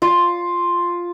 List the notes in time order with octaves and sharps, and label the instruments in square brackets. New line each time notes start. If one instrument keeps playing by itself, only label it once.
[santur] F4